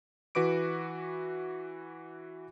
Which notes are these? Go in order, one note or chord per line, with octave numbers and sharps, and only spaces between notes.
E3 F#4 B4 D6 D7